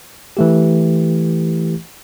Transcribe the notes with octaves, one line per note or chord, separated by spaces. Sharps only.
E3 A3 G4